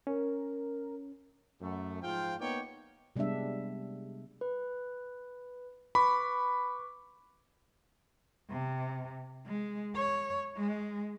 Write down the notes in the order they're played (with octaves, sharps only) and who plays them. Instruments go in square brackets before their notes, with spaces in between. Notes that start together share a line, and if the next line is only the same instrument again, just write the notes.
[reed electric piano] C#4 [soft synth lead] A#4
[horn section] F#2 A3
G#2 F3 F4 F5 G5
A#3 B3 D#4 C#5 D5 G5
[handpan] C3 G3 G#3 B3 D4 E5
[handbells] B4
[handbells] B4 C#6 D6 [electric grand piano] B5
[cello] C3
G#3
C#5
G#3